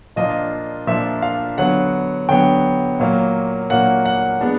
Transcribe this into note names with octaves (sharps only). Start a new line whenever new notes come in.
A#2 F3 A#3 D4 F4 D#5
A#2 F3 A#3 D4 F4 E5
F5
D3 F#3 B3 F#5
D3 F#3 B3 G5
A#2 F#3 A#3
A#2 F#3 A#3 F#5
F#5
G#3 B3 D4